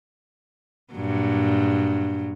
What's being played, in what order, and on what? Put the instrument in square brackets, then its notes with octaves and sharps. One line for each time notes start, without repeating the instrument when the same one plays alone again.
[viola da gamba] G2 A#2 F#3